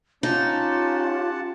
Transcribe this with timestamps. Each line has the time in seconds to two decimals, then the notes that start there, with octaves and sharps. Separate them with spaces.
0.23 C#4 D#4 F4 G4 F#5 A5